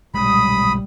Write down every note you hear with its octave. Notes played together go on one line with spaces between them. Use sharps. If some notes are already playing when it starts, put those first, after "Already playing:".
B1 A#2 G3 G#3 B5 D#6